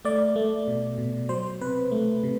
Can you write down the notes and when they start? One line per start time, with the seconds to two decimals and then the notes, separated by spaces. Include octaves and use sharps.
0.05 A3 D5
0.36 A3
0.68 B2
0.98 B2
1.29 F#3 C5
1.61 C3 B4
1.91 A3
2.23 C3